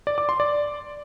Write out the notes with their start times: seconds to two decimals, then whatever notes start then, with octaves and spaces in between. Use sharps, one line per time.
0.07 D5
0.18 D6
0.29 C6
0.40 D5